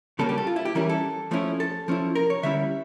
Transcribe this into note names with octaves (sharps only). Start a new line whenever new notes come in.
C#3 G3 A#3 C#4 A4
G4
A4
F4
E4
G4
E3 G3 C#4 E4 A#4
A4
F3 A3 C#4 E4
A4
F3 C#4 E4
A#4
C#5
D3 G3 C#4 E4 E5